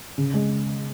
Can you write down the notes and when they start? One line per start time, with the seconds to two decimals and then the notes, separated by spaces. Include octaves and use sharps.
0.18 C#3
0.34 G#3